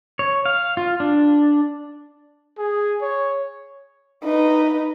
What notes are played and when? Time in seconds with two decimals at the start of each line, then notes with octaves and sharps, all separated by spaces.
0.19 C#5
0.46 F5
0.77 F4
1.00 D4
2.58 G#4
3.02 C#5
4.24 D#4 B4